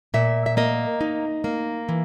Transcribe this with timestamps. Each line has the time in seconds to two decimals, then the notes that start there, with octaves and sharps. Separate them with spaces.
0.14 A#2 E5
0.46 E5
0.57 A#3 D#5
1.01 D#4
1.44 A#3
1.89 E3